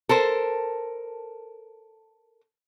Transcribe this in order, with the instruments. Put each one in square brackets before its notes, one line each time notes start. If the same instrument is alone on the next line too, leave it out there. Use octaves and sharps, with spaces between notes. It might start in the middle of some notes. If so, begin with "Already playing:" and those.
[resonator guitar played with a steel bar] A4 A#4 C5